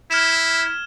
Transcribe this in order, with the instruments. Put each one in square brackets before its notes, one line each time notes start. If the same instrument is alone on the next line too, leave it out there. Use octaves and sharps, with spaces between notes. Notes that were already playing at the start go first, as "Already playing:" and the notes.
[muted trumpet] E4 [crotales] F6 G#6 E7